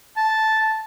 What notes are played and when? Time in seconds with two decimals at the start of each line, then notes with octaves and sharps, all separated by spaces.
0.16 A5